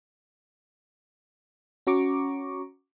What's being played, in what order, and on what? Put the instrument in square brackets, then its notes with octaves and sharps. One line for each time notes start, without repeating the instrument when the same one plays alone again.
[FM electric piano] C#4 F#4 A#5 C#6 D6